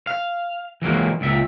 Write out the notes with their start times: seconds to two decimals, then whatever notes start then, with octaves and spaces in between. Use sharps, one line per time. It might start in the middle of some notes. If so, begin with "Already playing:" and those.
0.07 F5
0.82 E3 F#3 G#3 A#3
1.21 C#2 A#2 E5